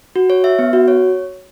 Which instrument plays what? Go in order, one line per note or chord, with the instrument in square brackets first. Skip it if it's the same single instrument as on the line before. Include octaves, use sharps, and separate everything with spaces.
[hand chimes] F#4
C#5
E5
B3
F#4
C#5